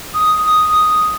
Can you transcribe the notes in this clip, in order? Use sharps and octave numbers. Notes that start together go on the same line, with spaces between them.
D#6